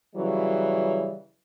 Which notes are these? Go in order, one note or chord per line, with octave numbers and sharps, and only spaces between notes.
C#3 E3 F#3 G3